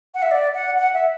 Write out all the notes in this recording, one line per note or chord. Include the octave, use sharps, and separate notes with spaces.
F#5
E5
D5
F#5
F#5
E5